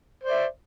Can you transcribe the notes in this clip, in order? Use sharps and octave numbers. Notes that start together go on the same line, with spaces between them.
C5 D5 E5